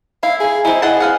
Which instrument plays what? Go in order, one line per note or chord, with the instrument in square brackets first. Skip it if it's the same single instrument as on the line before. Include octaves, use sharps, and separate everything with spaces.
[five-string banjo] E4 [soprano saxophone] F5
[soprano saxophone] G#4
[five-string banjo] C4 D#4 [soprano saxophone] E4
[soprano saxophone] G#4 [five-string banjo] D#5 F#5 A5
[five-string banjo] B4 F5 F#5